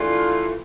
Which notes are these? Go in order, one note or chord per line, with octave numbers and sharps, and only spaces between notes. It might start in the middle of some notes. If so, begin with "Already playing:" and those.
Already playing: E3 A3 D4 F4